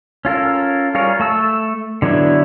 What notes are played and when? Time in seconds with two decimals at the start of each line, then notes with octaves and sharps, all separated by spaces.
0.25 C#4 F4 A4 A#4
0.95 G3 F4 G#4 A#4 C#5
1.20 A3 A5 E6
2.02 D3 F#3 B3 D4 E4